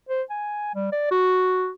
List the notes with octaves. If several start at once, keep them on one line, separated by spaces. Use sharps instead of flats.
C5
G#5
G3
D5
F#4